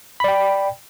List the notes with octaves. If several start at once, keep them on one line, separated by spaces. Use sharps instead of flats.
D5 G5 B5